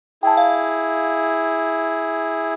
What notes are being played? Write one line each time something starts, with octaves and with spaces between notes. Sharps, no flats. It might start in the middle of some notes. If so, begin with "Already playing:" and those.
E4 G#4 G5 A5
F5